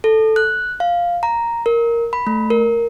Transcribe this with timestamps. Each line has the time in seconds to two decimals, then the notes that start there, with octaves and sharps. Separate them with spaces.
0.04 A4
0.36 F#6
0.80 F5
1.23 A#5
1.66 A#4
2.13 B5
2.27 A3
2.50 A#4